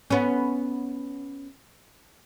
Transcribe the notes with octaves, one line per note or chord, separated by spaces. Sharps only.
B3 C#4